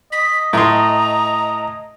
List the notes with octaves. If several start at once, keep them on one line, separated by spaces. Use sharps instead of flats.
D#5 B6
A2 A#5 C6